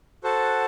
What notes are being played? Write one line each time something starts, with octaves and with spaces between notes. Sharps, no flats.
F#4 A4 C5 F#5 A5